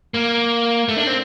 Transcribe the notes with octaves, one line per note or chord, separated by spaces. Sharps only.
A#3
A3
D4
C4